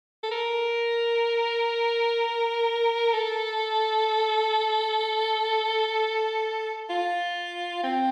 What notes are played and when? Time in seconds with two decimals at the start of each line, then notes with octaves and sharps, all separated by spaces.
0.23 A4
0.31 A#4
3.14 A4
6.90 F4
7.84 C4